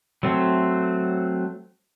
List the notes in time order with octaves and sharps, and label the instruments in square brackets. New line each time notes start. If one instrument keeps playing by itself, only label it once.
[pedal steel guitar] F#3 A3 C4